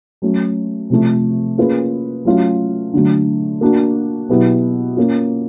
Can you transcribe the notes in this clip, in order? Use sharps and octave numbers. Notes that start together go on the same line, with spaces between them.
F#3 A3 C#4
C3 F3 A3
A#3 C#4 F4 G#4 B4
F#3 A3 C#4 F4
D3 F#3 A3
A#3 D4 F#4
B2 F#3 B3 E4 G4
A#3 C#4 F4